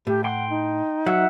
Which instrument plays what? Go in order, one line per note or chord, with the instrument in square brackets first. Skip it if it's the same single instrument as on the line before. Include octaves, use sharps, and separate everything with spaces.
[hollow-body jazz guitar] A2 [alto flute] G4
[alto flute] F#5 [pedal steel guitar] G5 C6
[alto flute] D#4
[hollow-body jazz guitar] F#3 [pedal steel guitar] E5 F#5